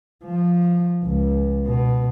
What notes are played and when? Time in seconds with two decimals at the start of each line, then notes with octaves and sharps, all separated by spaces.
0.25 F3
1.04 C#2
1.66 B2